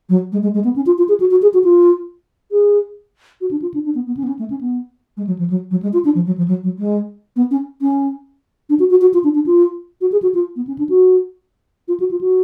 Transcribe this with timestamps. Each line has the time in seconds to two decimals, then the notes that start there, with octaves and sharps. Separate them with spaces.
0.09 F#3
0.32 G#3
0.43 G#3
0.54 G#3
0.64 B3
0.76 C#4
0.86 F4
0.98 F4
1.08 G#4
1.20 F#4
1.31 F#4
1.42 G#4
1.54 F#4
1.64 F4
2.52 G#4
3.41 F#4
3.51 D4
3.62 F4
3.74 D4
3.85 D4
3.95 B3
4.07 B3
4.17 C#4
4.24 B3
4.28 C#4
4.39 A3
4.50 C#4
4.61 B3
5.17 G#3
5.27 F#3
5.38 F3
5.50 F#3
5.71 F#3
5.82 G#3
5.93 F4
6.05 D4
6.15 F3
6.27 F#3
6.38 F3
6.48 F#3
6.63 F#3
6.79 G#3
7.36 B3
7.51 C#4
7.81 C#4
8.69 D4
8.79 F#4
8.90 F#4
9.01 F#4
9.14 F4
9.24 D4
9.35 D4
9.46 F4
10.01 F#4
10.12 G#4
10.22 F#4
10.34 F4
10.56 B3
10.67 C#4
10.78 D4
10.89 F#4
11.88 F4
12.00 F#4
12.11 F4
12.21 F#4